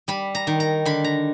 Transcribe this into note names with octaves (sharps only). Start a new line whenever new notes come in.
G3 B5
A#5
D#3
A#5
D3 B5
A#5